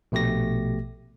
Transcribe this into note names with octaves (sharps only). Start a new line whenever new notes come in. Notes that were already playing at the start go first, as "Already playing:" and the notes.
A#1 B2 A3 G4 A#6